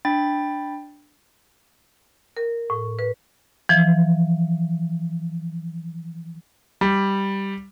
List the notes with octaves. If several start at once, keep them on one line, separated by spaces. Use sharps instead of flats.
D4 G5 B5 A6
A#4
A2
B4
E3 F3
G3